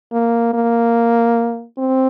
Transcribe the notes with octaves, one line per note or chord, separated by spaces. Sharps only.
A#3
A#3
C4